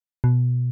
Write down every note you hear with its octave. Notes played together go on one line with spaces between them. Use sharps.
B2